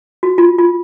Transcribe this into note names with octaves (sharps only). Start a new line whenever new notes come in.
F#4
F4
F4